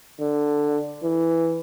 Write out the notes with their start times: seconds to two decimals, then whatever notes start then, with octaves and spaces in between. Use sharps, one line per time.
0.21 D3
1.04 E3